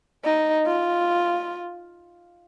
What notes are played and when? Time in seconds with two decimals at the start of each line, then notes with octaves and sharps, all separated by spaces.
0.25 D#4
0.67 F4